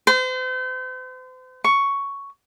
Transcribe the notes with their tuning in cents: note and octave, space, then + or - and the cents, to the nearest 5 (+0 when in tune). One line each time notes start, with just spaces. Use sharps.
C5 -40
C#6 +5